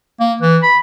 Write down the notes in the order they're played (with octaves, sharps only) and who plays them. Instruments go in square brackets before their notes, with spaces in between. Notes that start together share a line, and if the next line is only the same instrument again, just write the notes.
[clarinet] A#3
E3
B5